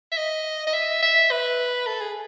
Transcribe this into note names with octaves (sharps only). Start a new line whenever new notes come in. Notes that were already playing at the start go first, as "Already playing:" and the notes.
E5
D#5
D#5
E5
E5
B4
A4
G#4